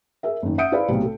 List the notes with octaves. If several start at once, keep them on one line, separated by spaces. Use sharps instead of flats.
G#4 A#4 E5
F#1 D#3
E5 F#5 D#6 G6 C#7 D7
E4 G#4 B4 C5 D5 F5
B1 A2 C3
A4